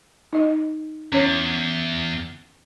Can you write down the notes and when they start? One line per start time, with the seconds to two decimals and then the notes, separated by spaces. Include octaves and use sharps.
0.33 D#4 D#5
1.12 E2 C#4 C#5